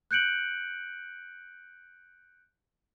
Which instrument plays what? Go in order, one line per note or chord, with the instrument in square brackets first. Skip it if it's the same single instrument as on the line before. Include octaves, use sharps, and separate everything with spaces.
[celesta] F#6 G6 C#7 D7 F#7